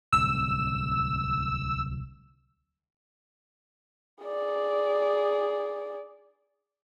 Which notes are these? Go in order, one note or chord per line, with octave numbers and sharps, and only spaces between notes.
D1 C2 E6
G#4 D5